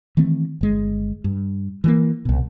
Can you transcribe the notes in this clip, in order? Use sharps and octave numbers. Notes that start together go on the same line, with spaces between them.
D#3 E3 A3 C4
G1 G#3
G2
E3 F3 A#3
C2 B2